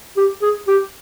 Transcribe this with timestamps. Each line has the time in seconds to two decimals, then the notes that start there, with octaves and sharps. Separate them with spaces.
0.17 G4
0.42 G#4
0.68 G4